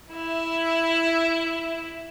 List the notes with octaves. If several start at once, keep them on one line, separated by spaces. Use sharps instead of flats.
E4 E5